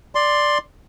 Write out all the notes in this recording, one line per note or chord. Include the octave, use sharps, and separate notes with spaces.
D5 C6